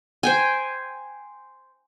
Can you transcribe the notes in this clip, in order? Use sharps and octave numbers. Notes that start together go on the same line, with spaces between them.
C5 G5 G#5